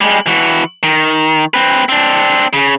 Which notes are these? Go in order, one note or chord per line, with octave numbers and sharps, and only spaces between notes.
G3 G#3
E3 F#4
D#3
C4 B4
C4 D4
C#3